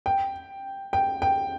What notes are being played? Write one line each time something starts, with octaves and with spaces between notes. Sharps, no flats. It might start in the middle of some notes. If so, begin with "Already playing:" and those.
G5
G5
G5